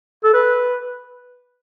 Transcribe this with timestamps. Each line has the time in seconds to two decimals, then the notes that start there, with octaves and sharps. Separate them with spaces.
0.24 A4
0.34 B4